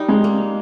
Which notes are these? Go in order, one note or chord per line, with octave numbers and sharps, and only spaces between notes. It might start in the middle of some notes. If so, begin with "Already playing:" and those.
Already playing: G3 D#4
G#3
A#3